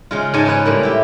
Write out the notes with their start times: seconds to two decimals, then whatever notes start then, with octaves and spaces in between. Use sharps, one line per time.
0.11 C#3 G#3 F4
0.34 G#2 G#3 C#5 G#5 A5
0.46 C#4 G#4 B4 C#5
0.65 A2 G3 A#3
0.83 G4 E5